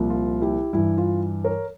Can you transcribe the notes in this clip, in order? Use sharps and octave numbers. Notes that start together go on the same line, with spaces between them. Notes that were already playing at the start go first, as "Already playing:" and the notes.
Already playing: C2 A#2 F3
F4
E4 G4
G2 E3 E4
F4
A#4 C#5